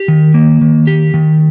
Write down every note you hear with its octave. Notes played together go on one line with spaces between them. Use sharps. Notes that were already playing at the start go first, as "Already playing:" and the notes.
Already playing: G4
D#3
A#3
D#3
G4
D#3